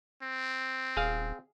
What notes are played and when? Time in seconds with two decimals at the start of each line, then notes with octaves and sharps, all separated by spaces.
0.22 C4
0.97 D#1 G#4 F5